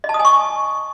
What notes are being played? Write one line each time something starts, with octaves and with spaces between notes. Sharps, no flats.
D#5
A5
D#6
G#5
C#6